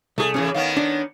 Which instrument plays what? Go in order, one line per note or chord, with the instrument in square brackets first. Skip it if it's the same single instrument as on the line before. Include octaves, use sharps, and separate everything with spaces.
[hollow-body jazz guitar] C2 G#4 [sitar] A3
[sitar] A2 C#3 E3 [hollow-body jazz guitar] C#4 G#4
[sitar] D#3 B3 C#4 [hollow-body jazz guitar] F5
[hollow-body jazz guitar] D4